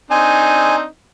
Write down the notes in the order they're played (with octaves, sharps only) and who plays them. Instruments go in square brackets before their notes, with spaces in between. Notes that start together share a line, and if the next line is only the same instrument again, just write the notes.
[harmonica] C4 D4 D#4 [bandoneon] G#5